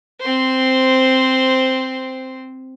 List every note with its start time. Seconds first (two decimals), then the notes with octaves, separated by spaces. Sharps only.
0.21 C4 C5